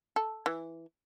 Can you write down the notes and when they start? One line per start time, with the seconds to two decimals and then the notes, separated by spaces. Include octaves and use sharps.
0.16 A4
0.46 E3